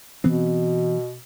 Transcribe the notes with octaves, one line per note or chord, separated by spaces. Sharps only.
B2 E3 B3 C4